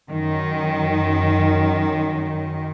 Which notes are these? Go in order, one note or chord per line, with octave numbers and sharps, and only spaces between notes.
F#2 D#3